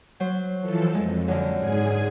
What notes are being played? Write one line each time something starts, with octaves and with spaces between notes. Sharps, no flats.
F#3 C5
E3 F3 A4
F2 G#3
F#2 D3
G#2 G#4 G#5